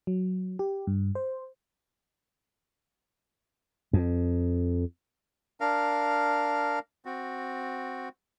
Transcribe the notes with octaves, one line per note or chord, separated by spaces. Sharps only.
F#3
G4
G2
C5
F2
D4 A#4 F5
C4 F#4